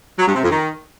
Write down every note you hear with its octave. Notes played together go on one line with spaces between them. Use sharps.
F#3
G2
C3
F2
D#3